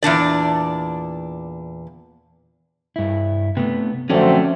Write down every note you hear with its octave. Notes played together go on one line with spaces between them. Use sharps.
E2 A#2 D4 D5
G2 E4
C3 A3 B3
D3 F3 F#3 A3 C4 C#4 A4 D5